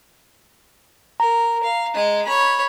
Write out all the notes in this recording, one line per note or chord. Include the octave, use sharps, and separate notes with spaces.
A#4 A#5
F5
G#3 D#5
C#5 B5